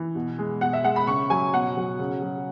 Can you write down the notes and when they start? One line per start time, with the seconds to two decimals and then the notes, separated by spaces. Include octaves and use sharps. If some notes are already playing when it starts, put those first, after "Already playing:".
Already playing: E3
0.15 B2
0.39 G#3
0.61 B2 F#5
0.73 E5
0.84 G#3 F#5
0.96 B5
1.07 C#3 C#6
1.30 F#3 G#5
1.53 B2 F#5
1.77 F#3
1.99 C#3
2.22 F#3